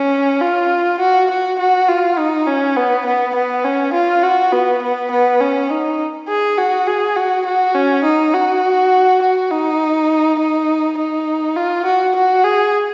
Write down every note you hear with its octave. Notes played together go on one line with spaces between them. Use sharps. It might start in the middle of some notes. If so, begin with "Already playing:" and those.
Already playing: C#4
F4
F#4
F#4
F#4
F4
D#4
C#4
B3
B3
B3
C#4
F4
F#4
B3
B3
B3
C#4
D#4
G#4
F#4
G#4
F#4
F#4
C#4
D#4
F#4
F#4
D#4
D#4
D#4
F4
F#4
F#4
G#4